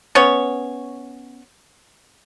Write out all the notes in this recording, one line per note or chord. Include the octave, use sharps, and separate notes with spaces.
B3 C#4 C#5